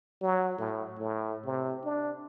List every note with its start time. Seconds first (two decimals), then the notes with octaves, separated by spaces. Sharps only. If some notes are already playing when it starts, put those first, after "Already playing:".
0.22 F#3
0.59 A2
0.99 A2
1.44 C3
1.84 D4